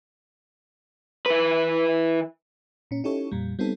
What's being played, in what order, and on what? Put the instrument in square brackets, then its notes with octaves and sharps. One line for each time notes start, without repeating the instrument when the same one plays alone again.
[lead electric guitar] E3 B4
[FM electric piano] A#2 C#4
C#4 D#4 E4 G4 A4 C#5
F2 A#2 G3
G3 B3 C4 D#4 A4